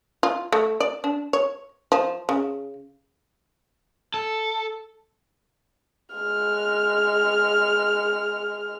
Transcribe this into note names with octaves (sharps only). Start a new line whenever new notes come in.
F4
A3
D5
D4
C#5
F3
C#3
A4
G#3 F6